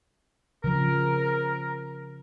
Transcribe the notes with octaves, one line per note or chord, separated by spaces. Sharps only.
C#3 F3 A#4